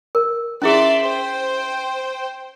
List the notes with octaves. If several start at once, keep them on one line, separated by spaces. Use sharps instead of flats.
A#4
C#4 E4 G#4 D5 E5 C6
C5 G5